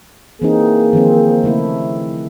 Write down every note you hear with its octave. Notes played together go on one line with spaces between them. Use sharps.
E3 A#3 C4 D#4 G#4
D#3 F3 C4
C#3 A3 E4